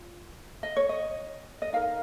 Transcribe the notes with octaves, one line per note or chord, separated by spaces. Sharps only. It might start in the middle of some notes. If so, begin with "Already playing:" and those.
Already playing: F4
D#5
C#5
D#5
D#5
D#4 A#4 F5